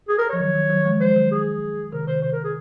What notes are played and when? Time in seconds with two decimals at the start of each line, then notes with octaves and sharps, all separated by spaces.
0.09 G#4
0.19 A#4
0.30 F3 C#5
0.40 D#3 F#3
0.54 D#3 F#3
0.69 D#3 F#3
0.85 F3 G#3
1.00 F3 G#3 C5
1.16 D#3 F#3
1.32 G#4
1.92 C3 D#3 A#4
2.07 C3 D#3 C5
2.22 C3 C5
2.33 A#4
2.44 G#4